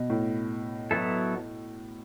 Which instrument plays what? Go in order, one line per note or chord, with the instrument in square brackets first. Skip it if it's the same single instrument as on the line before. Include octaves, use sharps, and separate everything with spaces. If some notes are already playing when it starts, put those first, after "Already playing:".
Already playing: [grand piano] B2
A2
[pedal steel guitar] F#3 B3 E4 A4